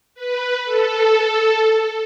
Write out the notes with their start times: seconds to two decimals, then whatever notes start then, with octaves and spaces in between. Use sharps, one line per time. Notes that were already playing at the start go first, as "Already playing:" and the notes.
0.15 B4
0.64 A4